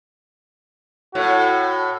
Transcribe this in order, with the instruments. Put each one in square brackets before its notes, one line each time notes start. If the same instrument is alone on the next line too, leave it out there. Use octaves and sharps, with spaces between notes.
[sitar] A2 [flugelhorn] F#4